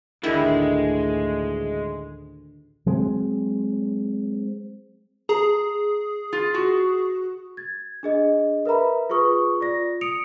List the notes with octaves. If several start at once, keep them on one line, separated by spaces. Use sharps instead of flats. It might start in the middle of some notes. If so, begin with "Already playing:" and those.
A1 D2 D3 D#3 G#3 E4 G4
F#3 G#3 C4
G#4 A#5
F4
F#4
G#6 A6
D4 G#4 D#5
A#4 B4 E5 A#5 B5
F4 G#4 B4 C#6 D#6
F4 D5 A#6
D#6 C#7 D7 F7